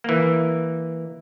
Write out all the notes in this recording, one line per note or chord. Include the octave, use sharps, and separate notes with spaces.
E3 A#3